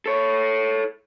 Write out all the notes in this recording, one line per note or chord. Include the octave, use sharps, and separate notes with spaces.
A4 C#5